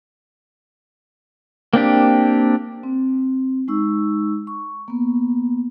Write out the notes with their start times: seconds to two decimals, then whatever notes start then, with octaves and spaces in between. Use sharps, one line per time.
1.73 A#3 C4 D4 G4
2.83 C4
3.68 G#3 D#4 C#6 E6
4.47 C#6
4.88 A#3 B3